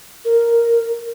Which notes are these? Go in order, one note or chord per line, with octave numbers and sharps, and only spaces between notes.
A#4